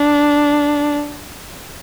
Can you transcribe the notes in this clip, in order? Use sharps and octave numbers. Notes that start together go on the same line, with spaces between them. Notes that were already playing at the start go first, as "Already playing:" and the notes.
Already playing: D4